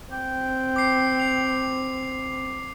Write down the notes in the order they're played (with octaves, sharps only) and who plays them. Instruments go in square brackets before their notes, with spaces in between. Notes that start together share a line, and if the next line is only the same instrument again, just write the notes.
[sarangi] C4 [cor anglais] G5
[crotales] D6 C7
C7 F7